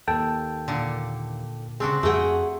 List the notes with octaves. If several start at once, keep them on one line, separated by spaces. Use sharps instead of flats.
D#2 A4 G5 A5
A#2 D3
C#3 C4 D4 F#4 G#4
F2 A3 F#4 G#4 F#5 G5